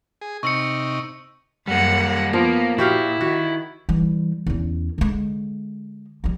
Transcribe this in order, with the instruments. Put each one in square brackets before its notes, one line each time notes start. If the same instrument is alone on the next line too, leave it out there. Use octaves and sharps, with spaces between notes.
[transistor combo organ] G#4
[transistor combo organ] C3 D#4 [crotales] C#6 E6 C#7
[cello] F#2 F#5 [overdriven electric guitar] G3 A#3
[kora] F3 [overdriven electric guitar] A#3 [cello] B3
[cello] A#2 [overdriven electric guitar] E4 [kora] F#4 G4 F5
[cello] D#3 [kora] F#4
[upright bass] E3 G3
E2 C#4
D3 G#3
F3 G3